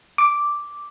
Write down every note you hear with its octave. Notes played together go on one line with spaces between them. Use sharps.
D6